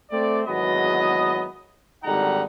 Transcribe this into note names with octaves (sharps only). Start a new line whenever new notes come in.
A3 C4 D5
G#1 E2 F#3 B3 D#5
G#1 D3 G3 D#4 F#5 A#5